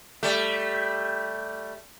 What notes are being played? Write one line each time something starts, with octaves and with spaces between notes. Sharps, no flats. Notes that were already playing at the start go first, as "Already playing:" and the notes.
G3 A3